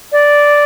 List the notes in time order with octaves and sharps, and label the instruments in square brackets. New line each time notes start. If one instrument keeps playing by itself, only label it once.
[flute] D5